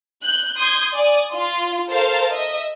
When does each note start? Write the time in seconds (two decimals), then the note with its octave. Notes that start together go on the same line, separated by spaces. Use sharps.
0.22 F#6 G6
0.57 C6 D#6 G6 G#6
0.95 D5 G#5 D#6
1.33 F4 F5 C6
1.89 A4 A#4 C5 F5 A5
2.31 D#5 E5